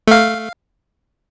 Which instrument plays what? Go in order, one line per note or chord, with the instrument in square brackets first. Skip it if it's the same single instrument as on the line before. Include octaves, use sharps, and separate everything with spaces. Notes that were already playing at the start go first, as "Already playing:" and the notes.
[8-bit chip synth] A3 F5